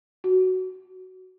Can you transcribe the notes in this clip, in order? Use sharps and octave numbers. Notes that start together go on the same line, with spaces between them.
F#4